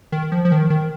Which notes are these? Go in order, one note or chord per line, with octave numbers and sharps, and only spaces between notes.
D#3
F3
F3
D#3
D#3